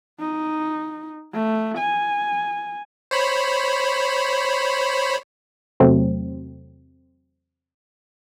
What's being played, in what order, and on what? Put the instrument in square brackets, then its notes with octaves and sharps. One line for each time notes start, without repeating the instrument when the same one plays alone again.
[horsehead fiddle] D#4
A3
G#5
[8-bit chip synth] C5 C#5 B5
[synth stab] E2 C3 F#3 A3 C4